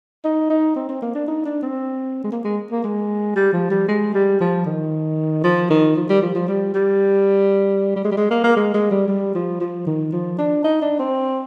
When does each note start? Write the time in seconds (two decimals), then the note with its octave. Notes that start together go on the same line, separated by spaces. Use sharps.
0.24 D#4
0.50 D#4
0.76 C4
0.89 C4
1.02 A#3
1.15 D4
1.28 D#4
1.45 D4
1.62 C4
2.24 G#3
2.32 A#3
2.44 G#3
2.72 A#3
2.84 G#3
3.36 G3
3.53 F3
3.71 G3
3.88 G#3
4.14 G3
4.40 F3
4.66 D#3
5.44 F3
5.70 D#3
5.96 F3
6.09 G3
6.22 F3
6.35 F3
6.48 G3
6.74 G3
7.96 G3
8.04 G#3
8.12 G3
8.17 G#3
8.31 A#3
8.44 A#3
8.56 G#3
8.74 G#3
8.91 G3
9.08 G3
9.35 F3
9.60 F3
9.87 D#3
10.12 F3
10.38 D4
10.64 D#4
10.81 D4
10.99 C4